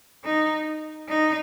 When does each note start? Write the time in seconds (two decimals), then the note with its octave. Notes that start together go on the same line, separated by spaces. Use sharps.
0.24 D#4
1.08 D#4